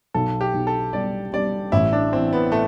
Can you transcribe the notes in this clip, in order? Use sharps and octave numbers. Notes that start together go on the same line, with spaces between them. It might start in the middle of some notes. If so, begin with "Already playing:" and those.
B1 A4
G4
B1
A4
G3 D5
G3 D5
A1 E4
D4
E3 C4
B3
A2 A3